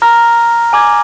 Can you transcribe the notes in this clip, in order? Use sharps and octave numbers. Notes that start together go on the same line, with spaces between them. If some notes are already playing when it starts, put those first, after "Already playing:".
A#5 F6 A#6
G#5 D6 G#6